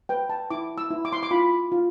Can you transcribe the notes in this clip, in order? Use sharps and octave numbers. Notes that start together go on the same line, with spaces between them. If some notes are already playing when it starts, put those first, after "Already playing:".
B4 G5
A5
E4 D6
E6
E4
D6
C6
D6
F4 B5
F4